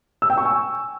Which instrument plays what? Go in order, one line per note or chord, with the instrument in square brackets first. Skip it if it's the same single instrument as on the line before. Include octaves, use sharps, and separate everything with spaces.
[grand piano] E6
G5
C#6
G#5